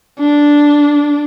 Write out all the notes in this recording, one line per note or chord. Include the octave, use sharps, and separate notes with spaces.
D4